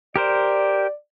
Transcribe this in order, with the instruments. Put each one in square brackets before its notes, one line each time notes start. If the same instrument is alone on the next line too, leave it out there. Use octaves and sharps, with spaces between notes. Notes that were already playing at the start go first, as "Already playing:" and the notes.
[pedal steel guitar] G4 A#4 C5 [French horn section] D5